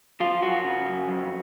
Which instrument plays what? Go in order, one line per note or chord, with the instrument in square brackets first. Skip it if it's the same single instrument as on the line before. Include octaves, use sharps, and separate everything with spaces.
[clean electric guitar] F3 F4
F#2 F#4
C#3
F#2
F2